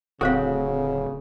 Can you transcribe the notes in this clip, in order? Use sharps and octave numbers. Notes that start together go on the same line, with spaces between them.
D1 C#3 C4 F#4 A4 C5 F5